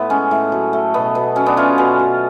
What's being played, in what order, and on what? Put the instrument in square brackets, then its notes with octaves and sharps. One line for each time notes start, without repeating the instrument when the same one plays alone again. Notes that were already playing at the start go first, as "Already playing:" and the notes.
Already playing: [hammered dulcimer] A2 B3 F4
G#3 C#4
A2
F#3
A3
B2 B3
B2
F#3 C#4
B3 D4
A3 C#4 F4
B2 C#4
B2